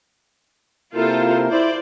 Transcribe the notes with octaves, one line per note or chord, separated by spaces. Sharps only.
C3 A#3 E4 F4 A4 A#4 C5
E4 C5 D5